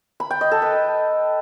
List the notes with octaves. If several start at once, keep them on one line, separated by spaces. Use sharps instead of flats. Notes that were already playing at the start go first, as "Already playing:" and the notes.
B5
G5
D#5
A4
B4